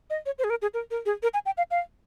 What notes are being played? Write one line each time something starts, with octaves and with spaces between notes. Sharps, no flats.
D#5
C#5
C5
G#4
A#4
G#4
A#4
A#4
G#4
A#4
G#5
G5
F5
F5